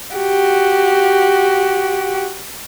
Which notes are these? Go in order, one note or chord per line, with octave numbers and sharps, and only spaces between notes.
F#4 G4